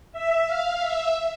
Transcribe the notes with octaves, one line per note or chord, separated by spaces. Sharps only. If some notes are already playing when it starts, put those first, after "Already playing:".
E5
F5
E5